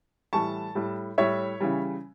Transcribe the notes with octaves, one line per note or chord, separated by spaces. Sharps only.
A2 E3 G3 A5 C#6
A2 G3
A2 G3 C#5 E5
C#3 E3 G3